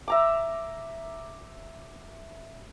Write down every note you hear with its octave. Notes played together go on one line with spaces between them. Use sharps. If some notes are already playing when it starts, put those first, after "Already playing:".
E5 A#5 D6